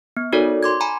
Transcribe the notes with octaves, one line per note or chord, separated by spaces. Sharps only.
B3
D#4 F#4 A4 A#4 C#5 D5
C6 D6 G#6
G#5 A#5 B5